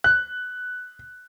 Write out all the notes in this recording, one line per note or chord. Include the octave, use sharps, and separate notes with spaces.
F#6